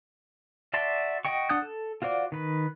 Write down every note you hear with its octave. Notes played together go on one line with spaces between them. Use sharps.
F#4 D5 E5 A5 C6
F#4 D#5 G5 C#6
D4 F#5 D#6 F#6 G6
A4
F4 F#4 C5 D5
D#3 B4